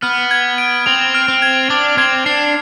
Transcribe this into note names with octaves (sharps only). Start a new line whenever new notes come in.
B3 F6
G#6
D7
C4 F7
F6
C4
G#6
D4 D6
C4 G#6
D4 C7